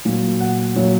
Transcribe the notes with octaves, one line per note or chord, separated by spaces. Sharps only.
A#2 F#3
F#5
A#2 F#3 C#5